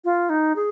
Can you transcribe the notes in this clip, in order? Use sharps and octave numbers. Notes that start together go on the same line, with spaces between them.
F4
D#4
G#4